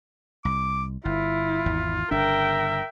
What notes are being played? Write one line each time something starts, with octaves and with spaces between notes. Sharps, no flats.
C2 D6
G1 E4 F4
G#1 E2
G1 C#3 D4 A#4 E5 G5